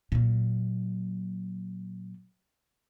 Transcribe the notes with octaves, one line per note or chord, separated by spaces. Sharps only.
A#2 F#3